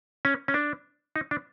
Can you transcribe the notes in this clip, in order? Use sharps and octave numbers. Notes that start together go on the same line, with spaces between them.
C#4
C#4
D4
D#4
D4